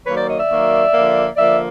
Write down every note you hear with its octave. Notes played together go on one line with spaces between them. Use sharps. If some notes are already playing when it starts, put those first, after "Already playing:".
D#3 F#3 A#3 B4 C#5
C5 D5
C#5 D#5
D5 E5
D#3 F#3 A#3
D3 F3 A#3
D3 F3 A#3 D5 E5